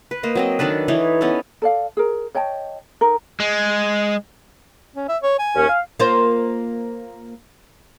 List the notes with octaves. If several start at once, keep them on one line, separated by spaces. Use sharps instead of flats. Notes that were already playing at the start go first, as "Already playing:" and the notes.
B4
A#3 C5 D#5
F#3 C4 D#5
D#3 D4 A4 B4
E3 D#4 C#5 D5
B3 C#4 D#4 A4
A4 D5 F5
G#4 A#4
C#5 D#5 G5 A5
D#4 A#4
G#3
C#4
E5
C#5
G#5
D#2 C#4
F5
A#3 F4 C5